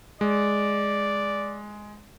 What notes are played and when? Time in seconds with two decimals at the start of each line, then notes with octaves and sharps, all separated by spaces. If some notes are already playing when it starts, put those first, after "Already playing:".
0.21 G#3 D5